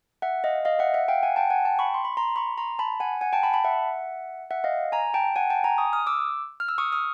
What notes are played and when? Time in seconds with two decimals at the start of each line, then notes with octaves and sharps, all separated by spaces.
0.22 E5 F#5
0.44 D#5 F5
0.65 D#5 F5
0.79 E5 F#5
0.94 E5 F#5
1.08 F5 G5
1.23 F#5 G#5
1.36 G5 A5
1.50 F#5 G#5
1.65 G5 A5
1.79 B5 C#6
1.94 C6
2.05 B5
2.17 A#5 C6
2.36 B5 C#6
2.58 A#5 C6
2.79 A5 B5
3.00 F#5 G#5
3.21 F#5 G#5
3.33 G5 A5
3.43 A5 B5
3.54 A5 B5
3.64 E5 F#5
4.51 E5 F#5
4.64 D#5 F5
4.92 G#5 A#5
5.14 G5 A5
5.36 F#5 G#5
5.50 G5 A5
5.64 G#5 A#5
5.78 C#6 D#6
5.93 D#6 F6
6.07 D6 E6
6.60 F6
6.68 E6
6.78 C#6 D#6
6.92 D#6 F6